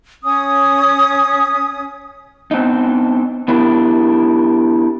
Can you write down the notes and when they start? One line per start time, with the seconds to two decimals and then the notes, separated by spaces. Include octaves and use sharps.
0.23 C#4 D#6
2.51 B3 C4 D4 D#4
3.48 B3 D4 E4 G4 A#4